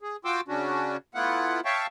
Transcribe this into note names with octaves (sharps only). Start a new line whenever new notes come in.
G#4
F4 F#4 G5 C6 D6 E6
C#3 C#4 D4 F#4
A3 B3 E4 F4 F#5
C#5 E5 F5 G5 A5 C#6